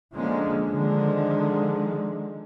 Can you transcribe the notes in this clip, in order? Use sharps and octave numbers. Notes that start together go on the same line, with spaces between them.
D3 F3 G#3 A#3 C#4
D3 D#3 F3 G#3